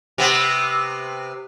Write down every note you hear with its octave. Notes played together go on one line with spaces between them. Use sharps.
C3 B3